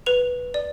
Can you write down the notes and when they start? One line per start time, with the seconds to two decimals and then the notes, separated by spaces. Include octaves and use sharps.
0.06 B4 F7
0.54 D5